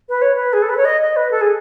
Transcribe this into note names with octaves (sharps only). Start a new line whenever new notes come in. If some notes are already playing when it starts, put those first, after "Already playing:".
B4
C#5
B4
G#4
A4
B4
C#5
D#5
D#5
B4
A4
G#4